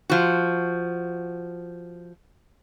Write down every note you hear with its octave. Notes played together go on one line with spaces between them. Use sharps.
F3 F#4